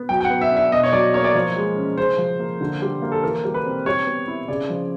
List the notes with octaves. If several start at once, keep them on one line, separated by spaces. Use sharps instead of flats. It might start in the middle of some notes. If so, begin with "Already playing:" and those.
Already playing: B3
F#3 G5
G5
F#5
B3
E5
D4
E5
B2 D#5
C#5
F#3 D5
A#3 C#5
D5
F3 C#5
G#3
C#4
C#3 C5
F3
A#3
D3
G3
A#3
A4
E3 A#4
G3
B4
C4
G3 C#5
B3
E4
C#3 D5
F3